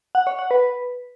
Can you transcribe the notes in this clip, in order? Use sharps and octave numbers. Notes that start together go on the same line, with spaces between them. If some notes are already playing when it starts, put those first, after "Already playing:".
F#5
C#5
F#5
B4